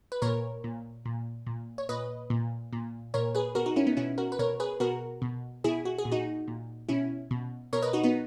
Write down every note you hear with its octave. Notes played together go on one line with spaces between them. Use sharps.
B4
A#2 A#4 C#5
A#2
A#2
A#2
C#5
A#2 B4 D#5
A#2
A#2
A#2 A#4 C#5
G#4 B4
B2 F#4 A#4
D#4 F#4
C#4 E4
B3 D#4
B2 C#4 E4
F#4 A#4
B4
B2 A#4 C#5
G#4 B4
B2 F#4 A#4
B2
B2 E4 G#4
F#4
G#4
A#2
D#4 F#4
A#2
B2 C#4 E4
B2
B2 A#4 C#5
B4 D#5
D#4 F#4
B3 D#4